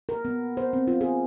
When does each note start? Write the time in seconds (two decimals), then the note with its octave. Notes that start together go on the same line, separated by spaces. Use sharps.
0.09 A#4
0.25 B3
0.57 C5
0.73 C4
0.87 F4
1.01 G#4